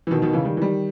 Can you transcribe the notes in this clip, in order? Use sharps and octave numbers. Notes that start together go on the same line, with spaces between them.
E3
B2 D#3
B2 D#3
C#3 E3
D#3 G3
E3
D#3 G3